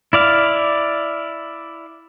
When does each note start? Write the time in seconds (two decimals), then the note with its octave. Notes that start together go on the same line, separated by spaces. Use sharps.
0.13 E4 D5 F5